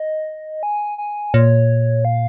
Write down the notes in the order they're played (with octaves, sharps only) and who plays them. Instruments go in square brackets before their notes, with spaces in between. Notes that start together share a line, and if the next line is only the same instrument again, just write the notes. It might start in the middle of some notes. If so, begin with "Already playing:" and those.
Already playing: [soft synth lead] D#5
G#5
G#5
[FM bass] A#2 [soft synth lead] C#5
[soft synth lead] F5